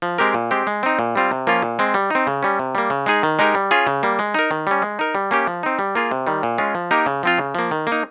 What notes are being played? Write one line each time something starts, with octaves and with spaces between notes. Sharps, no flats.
F3
G#3 C4 G4 A#4
A#2
G#3 C4 G4
G#3
C4 D#4
A#2
G3 C4 F4
C3
F3 A#3 C#4 F4
A#2
G#3 C4
G3
C4 D#4
C#3
G3 C#4
C3
G3 A#3
C#3
G#3 D#4 G#4
D#3
G#3 D#4 G4 A#4
G3
C#4 F4 G#4
C#3
G3 A#3
G#3
D#4 A#4
D#3
G3 C#4
G#3
D#4 A#4
G3
A#3 C#4 G4
F3
C4 D#4
G3
A#3 F4 G#4
C3
D#3 G3
A#2
G#3 C#4 F4
F3
A#3 D#4 G4 A#4
C#3
F3 C4 F4
C#3
F3 A#3
D#3
A#3
D#4